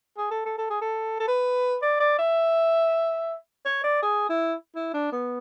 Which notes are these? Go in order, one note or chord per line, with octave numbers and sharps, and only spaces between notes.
G#4
A4
A4
A4
G#4
A4
A4
B4
D5
D5
E5
C#5
D5
G#4
E4
E4
D4
B3